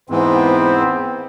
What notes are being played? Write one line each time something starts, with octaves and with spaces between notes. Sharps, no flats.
E2 G#2 E3 B3 C4